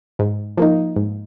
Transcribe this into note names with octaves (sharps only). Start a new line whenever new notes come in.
G#2
F3 A#3 D#4
G#2